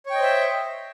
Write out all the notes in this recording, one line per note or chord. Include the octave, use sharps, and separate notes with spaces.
C5 C#5 D#5 E5 G5